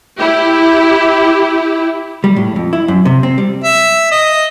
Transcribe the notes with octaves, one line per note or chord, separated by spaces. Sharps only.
E4 G4
G3
A2
F2
E4
F#2
C3
C4
G3
E5
D#5